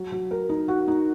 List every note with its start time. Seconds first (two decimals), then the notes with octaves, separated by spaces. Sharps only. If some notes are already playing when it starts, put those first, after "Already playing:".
Already playing: F#3
0.12 F#3
0.31 A#4
0.49 D#4
0.68 F#4
0.88 D#4